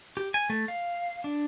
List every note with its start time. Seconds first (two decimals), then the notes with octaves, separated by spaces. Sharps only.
0.17 G4
0.34 G#5
0.50 A3
0.68 F5
1.24 D4